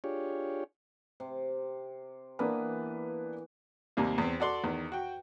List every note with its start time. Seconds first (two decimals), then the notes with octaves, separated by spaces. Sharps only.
0.04 D4 F4 G4 G#4 C#5
1.20 C3
2.39 E3 A#3 B3 D4 B4
3.97 D#2 C3 G3 A#3
4.18 E2 C4
4.40 F#4 A4 D5 C6
4.63 E2 D#3
4.92 F#4 G5